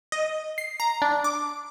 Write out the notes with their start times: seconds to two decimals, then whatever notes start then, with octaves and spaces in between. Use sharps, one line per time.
0.12 D#5
0.58 C7
0.80 A#5
1.02 D4
1.24 D6